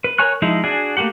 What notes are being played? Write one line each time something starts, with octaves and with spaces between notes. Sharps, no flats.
B4
A#4 C#5 G#5 C#6 F#6
F3 G#3 D#4 E4
D4 F#4 G#4 D5 G#5
A3 A#3 F#4 G4 F#5